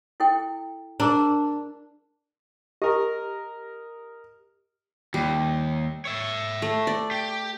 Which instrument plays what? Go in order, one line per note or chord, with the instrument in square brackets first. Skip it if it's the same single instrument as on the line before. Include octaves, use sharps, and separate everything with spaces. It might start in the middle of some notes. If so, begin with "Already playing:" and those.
[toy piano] E4 A4 G5
[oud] D4 [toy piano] G#4 A#4 A#5
[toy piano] G4 [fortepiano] A#4 D#5
[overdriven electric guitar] D#2 [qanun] G3
[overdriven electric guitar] C#5 E5
[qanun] A3
D5
[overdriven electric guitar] G4